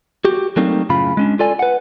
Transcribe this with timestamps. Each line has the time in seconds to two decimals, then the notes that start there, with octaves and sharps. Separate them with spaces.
0.25 F#4 G4
0.57 F#3 G3 A3 A#3 C4 D#4
0.90 F#2 A2 C#3 F4 B5
1.17 G#3 C#4 D4
1.39 F4 A4 D5 G#5
1.59 B4 F#5